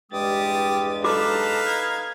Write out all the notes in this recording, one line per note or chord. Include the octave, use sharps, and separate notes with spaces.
E2 G2 G3 G#3 G4 D#6 A6
D#4 F#4 A4 B4 F5 A5 D6
G#6